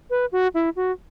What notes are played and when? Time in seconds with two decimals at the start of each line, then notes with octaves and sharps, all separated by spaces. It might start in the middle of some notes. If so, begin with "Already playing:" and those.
0.10 B4
0.32 F#4
0.54 E4
0.76 F#4